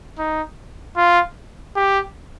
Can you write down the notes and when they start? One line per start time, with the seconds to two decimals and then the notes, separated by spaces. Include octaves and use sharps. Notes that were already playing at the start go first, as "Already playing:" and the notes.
0.19 D#4
0.96 F4
1.76 G4